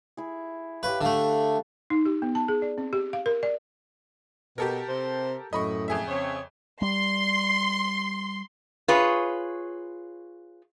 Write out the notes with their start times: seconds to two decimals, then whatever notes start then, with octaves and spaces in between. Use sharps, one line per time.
0.17 E4 G#4
0.83 G4 B4 C#5 F5
1.01 D3 A3 F5 F#5 A5
1.90 D#4
2.06 G4
2.22 B3
2.35 A5
2.48 G#4
2.62 D5
2.78 C4
2.93 G4
3.13 F5
3.26 A#4
3.43 D5
4.58 B2 G4 A4 A#4
4.89 C3 C5
5.53 F#2 A2 D#5 B5 C#6
5.88 F2 G#4 E5
6.08 C#3 C4 C#5
6.82 G3 C6
8.88 F4 G#4 B4 C#5